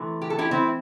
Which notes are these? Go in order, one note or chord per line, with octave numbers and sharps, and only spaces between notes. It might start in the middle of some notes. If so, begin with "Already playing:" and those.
Already playing: C3 E3 A3
G4
A4
E4 G4
C4 E4